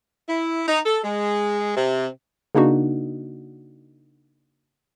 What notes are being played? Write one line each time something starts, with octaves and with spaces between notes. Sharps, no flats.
E4
D#4
A4
G#3
C3
C#3 A#3 D4 D#4 F#4